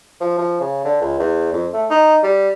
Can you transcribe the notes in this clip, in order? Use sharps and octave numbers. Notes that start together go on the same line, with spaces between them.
F3
F3
C#3
D3
C#2
E2
F2
A3
D#4
G3